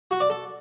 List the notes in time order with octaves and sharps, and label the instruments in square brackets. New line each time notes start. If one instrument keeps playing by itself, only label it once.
[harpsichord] F#4
D5
A4